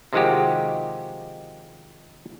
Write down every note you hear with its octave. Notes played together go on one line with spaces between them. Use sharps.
C3 D#3 F3 G#3 F#4 G4